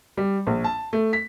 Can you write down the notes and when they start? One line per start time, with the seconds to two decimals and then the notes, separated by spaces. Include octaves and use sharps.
0.17 G3
0.47 A#1
0.64 A5
0.93 A3
1.13 B6